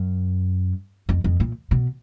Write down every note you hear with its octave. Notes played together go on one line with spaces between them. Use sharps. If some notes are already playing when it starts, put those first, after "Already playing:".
Already playing: F#2
F2
F2
A#2
B2